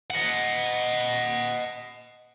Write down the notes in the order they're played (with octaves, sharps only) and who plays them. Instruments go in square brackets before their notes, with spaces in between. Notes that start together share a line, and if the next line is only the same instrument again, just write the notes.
[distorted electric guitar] D#5 F#5